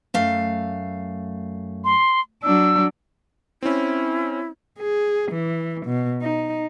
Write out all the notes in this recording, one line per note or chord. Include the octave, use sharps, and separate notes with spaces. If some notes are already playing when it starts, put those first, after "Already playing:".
F#2 A3 F5
C6
F#3 D4 E6
C4 C#4 E4
G#4
E3
B2
D#4